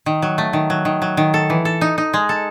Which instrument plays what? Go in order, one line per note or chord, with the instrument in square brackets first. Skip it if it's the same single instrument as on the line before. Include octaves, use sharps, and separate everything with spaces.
[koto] D#3
F#3
A3
D#3
F#3
D#3
F#3
D#3
A4
E3
A4
D#4
D#4
G#3
A4